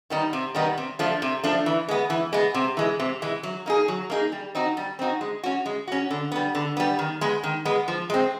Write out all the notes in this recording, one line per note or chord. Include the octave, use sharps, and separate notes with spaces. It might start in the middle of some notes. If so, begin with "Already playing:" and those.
D#3 G3 B3 D#4
C3
D#3 G3 B3 D#4
C3
F3 A3 D4
C3
F3 A3 D4
E3
G#3 B3
E3
G#3 B3
C3
E3 G#3
C3
E3 G#3
F#3
A#3 D#4 G#4
F#3
A#3 D#4 G#4
G3
C4 D#4 F#4
G3
C4 D#4 F#4
G#3
C#4 F#4
G#3
C#4 F#4
D3
G3 B3
D3
G3 B3
D#3
G#3 B3
D#3
G#3 B3
F3
G#3 C4